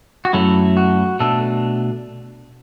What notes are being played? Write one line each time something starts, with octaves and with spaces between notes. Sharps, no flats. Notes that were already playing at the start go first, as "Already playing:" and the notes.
F#4
F#2 F#3 A3 E4 A4
F#4
B2 A3 D4 A4